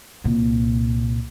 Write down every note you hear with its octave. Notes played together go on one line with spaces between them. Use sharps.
C2 A#2